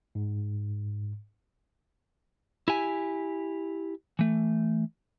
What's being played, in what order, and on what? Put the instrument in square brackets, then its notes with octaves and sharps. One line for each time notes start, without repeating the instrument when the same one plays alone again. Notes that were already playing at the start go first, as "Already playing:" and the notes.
[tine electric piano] G#2
[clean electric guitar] E4 G4 G#5
E3 A3